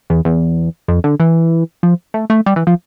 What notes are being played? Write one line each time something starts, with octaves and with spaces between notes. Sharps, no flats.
E2
E2
F2
D3
E3
F3
A3
A3
G3
E3
F3